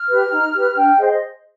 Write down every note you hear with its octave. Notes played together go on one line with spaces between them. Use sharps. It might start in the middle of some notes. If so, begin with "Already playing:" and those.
Already playing: F6
G4 B4
D#4
G4 B4
D4 G5
G#4 C5 D#5